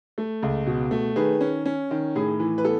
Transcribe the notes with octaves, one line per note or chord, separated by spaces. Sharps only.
A3
C#2
B2
A3
D#3 G#4 B4
C#4
C#4
D#3
A2 G#4
E3
B4
B3 A4